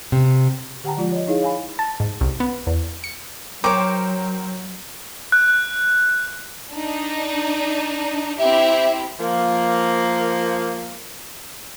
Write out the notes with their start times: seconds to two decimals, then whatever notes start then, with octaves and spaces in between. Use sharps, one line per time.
0.12 C3
0.83 D3 G4 F#5 G5 A5 A#5
0.97 F3 G#3 F4 D5
1.11 C#5 D#5
1.28 D#4 E4 G#4 C#5 F5
1.41 C#5 F5 G#5 B5
1.79 A5
2.00 G#2
2.21 C2
2.40 B3
2.67 E2
3.04 C#7
3.64 F#3 A#4 C5 C#5 G5 D6
5.32 F#6
6.72 D4 D#4
8.39 C4 E4 G4 E5
9.18 F3 A#3